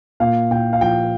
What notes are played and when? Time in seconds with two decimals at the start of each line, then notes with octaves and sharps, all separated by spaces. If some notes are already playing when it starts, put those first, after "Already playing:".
0.20 A#2 F5
0.51 A#2 G5
0.73 F5
0.81 F3 G5